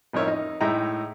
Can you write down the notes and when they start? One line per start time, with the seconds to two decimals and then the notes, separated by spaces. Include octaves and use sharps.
0.13 A1 F2 D#4 A#4 C#5 E5
0.28 D#4
0.61 A2 G#3 D#4 E5 G5 A#5